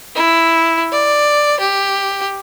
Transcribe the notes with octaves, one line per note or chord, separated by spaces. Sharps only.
E4
D5
G4